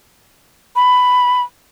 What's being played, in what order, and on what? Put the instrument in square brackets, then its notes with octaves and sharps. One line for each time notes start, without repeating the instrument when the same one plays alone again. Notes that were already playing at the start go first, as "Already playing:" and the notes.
[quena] B5